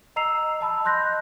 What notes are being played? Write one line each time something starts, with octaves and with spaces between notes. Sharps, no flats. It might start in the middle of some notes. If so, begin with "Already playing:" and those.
D#5 A#5 E6 C7 F7
D#5 A5 B5 E6
D#5 C6 F#6 G6 A#6